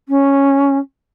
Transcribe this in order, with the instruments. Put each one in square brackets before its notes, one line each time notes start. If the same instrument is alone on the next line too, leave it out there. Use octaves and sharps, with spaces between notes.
[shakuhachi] C#4